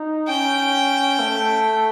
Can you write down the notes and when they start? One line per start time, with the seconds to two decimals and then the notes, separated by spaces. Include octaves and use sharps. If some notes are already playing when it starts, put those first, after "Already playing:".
Already playing: D#4
0.28 C#4 G5
1.19 A3